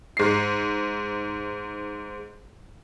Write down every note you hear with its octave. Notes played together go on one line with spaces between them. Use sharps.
G#2 C7